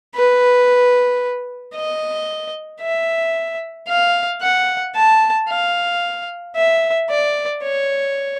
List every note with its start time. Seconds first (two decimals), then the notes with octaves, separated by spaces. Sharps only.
0.15 B4
1.75 D#5
2.82 E5
3.89 F5
4.42 F#5
4.95 A5
5.50 F5
6.56 E5
7.10 D5
7.64 C#5